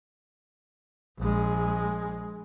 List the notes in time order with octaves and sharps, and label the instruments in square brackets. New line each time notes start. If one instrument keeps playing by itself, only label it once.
[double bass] A#1 G#3